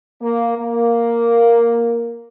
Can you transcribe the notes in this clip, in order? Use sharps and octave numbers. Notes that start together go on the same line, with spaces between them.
A#3
A#3